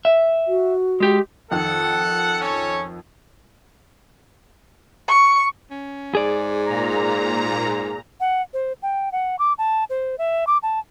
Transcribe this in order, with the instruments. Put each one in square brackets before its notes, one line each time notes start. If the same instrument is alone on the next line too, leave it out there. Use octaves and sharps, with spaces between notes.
[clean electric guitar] E5
[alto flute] F#4
[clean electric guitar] G#3 G4
[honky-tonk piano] F2 D#3 [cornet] A4 [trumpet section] F#5
[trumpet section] C#4 C#5
[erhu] C#6
[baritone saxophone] C#4
[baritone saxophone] G#2 [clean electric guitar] G#4 D5
[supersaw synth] A#2 A#5
[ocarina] F#5
C5
G5
F#5
D6
A5
C5
E5
D6
A5